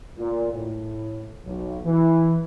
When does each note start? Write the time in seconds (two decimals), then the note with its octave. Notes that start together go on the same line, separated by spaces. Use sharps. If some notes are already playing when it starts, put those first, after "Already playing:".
0.18 A#2
0.52 A2
1.45 B1
1.85 E3